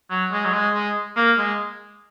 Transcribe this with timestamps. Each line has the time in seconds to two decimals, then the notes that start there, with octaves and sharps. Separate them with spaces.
0.10 F#3
0.32 G#3
0.45 F#3
0.53 G#3
0.74 G#3
1.16 A#3
1.38 G#3